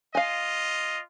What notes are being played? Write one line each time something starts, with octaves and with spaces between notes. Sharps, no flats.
F4 D#5 F5 G#5